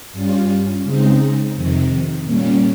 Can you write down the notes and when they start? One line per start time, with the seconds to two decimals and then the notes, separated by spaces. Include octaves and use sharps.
0.12 G2 G3 C#4 F4
0.84 C#3 G#3 C4 D#4
1.55 F2 C3 D#3
2.25 A#2 G3 A#3 C#4